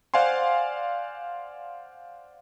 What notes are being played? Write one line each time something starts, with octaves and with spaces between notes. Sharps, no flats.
C5 D5 F5 F#5 G#5 C6